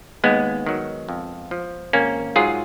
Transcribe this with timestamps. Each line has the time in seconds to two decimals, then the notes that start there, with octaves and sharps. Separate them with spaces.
0.24 D#2 G#3 B3
0.66 D#3 F#3
1.09 F2
1.51 F3
1.93 G#1 A#3 C#4
2.36 G#2 F#3 F4 G#4